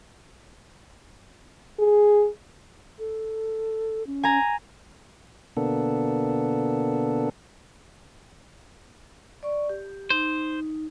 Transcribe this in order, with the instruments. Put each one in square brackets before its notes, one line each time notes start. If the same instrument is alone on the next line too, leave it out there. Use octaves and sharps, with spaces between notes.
[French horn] G#4
[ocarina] A4
C#4
[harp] G#5 A#5
[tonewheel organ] B2 D3 A#3 B3 D4 A4
[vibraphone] D5 C#6
G4
[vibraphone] D#4 [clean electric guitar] C5